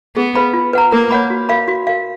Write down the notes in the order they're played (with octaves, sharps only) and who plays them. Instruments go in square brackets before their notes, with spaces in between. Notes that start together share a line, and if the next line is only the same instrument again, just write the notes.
[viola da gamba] B3 [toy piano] G#4
[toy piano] B4 F5 B5
F4
B4 F#5 A#5
[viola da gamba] A#3 [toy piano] A#4
[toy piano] C#5 F#5 B5
F#4
A#4 F5 B5
F#4
A#4 F5